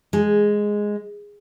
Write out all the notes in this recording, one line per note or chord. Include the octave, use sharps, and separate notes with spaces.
G#3